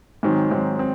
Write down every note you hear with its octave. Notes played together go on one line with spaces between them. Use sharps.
G#2 D#3 F#3 C4
G#2 D#3 F#3 C4
C4